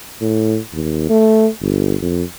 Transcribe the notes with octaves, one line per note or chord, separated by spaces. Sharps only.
A2
D#2
A3
G1
F2